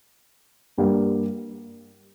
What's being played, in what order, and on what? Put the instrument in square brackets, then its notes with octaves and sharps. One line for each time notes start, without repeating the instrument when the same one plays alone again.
[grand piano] G2 G3 A#3